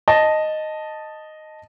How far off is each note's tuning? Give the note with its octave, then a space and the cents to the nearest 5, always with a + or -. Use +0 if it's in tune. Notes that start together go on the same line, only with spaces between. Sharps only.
D#5 -5 A5 +0